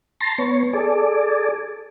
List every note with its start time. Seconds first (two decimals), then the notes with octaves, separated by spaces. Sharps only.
0.21 A5 A#5 C6
0.38 B3 C#5
0.73 G#4 A4 D5